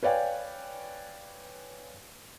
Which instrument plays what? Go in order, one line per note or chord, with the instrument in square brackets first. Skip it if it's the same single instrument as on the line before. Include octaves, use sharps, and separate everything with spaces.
[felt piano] B4 C#5 D5 F5 G5 G#5